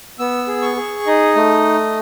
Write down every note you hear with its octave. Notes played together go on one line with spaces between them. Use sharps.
B3 E6
G#4
C#6
G#4
D#4 D#5
A3